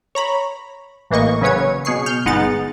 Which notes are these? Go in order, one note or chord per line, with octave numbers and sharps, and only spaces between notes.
C#5 A#5 B5
A1 E3 A#3 D#5 C#6
C#3 F#3 C#4 B4 C#5 G#6
B2 G#4 C#6 C7
F6 G6
G1 G#3 B3 D#4 F#5 A6